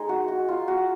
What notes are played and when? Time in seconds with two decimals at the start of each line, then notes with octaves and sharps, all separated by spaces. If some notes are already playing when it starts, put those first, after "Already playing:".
Already playing: G#3 D#4 G#4
0.09 F#4
0.28 F#4
0.48 F4
0.68 F#4